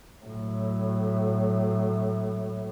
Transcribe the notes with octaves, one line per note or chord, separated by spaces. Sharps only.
A2 F#3